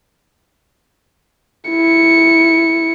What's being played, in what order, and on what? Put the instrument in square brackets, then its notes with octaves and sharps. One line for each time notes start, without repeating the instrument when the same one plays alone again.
[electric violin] E4 C#7